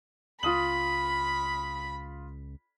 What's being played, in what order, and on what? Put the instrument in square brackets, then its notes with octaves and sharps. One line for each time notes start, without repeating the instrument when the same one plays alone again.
[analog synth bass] C#2 [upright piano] F4 D#6 F#7 [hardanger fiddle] B5